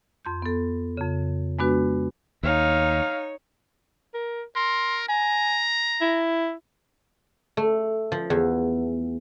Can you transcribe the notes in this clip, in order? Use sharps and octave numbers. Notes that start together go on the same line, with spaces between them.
F2 C6 G6
B3 A4
F2 C#3
G#3 B3 D4 F#4 B4
D#2 D#4 C#5 F5
A#4
A#4 C6
G#5 A#5
E4
A3
F3
E2